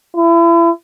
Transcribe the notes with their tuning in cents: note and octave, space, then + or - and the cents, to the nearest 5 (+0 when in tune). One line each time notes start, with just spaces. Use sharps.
E4 +35